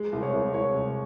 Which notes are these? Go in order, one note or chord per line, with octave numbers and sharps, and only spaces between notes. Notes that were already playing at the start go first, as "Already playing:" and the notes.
Already playing: G#3
C2
C#5
C2
C2 C#5
C2